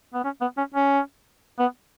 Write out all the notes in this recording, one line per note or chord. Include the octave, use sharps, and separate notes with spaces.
B3
C#4
B3
C#4
C#4
B3